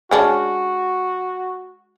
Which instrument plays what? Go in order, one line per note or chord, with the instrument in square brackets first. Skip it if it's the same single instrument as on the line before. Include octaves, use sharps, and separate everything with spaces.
[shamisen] G#3 C#4 D4 [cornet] F#4